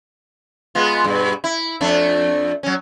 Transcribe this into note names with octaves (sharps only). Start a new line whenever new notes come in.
G#3 B3 F4
G2 B2
E4
F2 A3 D4
F#3 C#4